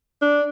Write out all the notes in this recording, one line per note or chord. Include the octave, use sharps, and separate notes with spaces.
D4